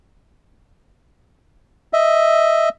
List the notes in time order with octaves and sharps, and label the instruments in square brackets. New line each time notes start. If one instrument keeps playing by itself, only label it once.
[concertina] D#5 E5